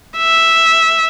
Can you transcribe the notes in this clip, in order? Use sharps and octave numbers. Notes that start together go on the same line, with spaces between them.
E5